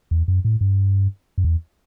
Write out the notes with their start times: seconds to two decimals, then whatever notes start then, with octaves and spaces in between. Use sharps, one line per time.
0.11 E2
0.28 F#2
0.45 A2
0.61 G2
1.38 F#2
1.44 E2